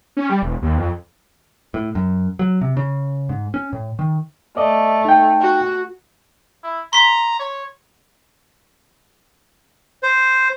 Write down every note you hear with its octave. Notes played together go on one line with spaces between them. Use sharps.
C#4
G3
E1
D#2
F2
A2
F#2
F#3
C3
C#3
G#2
C#4
A2
D#3
A3 D5 D#5
D#4 G5
F#4
E4
A#5 C6 B6
C#5
C5